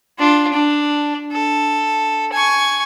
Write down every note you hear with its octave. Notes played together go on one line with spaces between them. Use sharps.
D4 F4
D4
A4
G#5 C#6